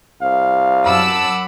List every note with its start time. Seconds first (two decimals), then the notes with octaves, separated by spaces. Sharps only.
0.22 C2 F5
0.86 F#2 F#5 A5 B5 D6 E6